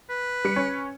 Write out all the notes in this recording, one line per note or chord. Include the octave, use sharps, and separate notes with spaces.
B4
G3 C#7
C#4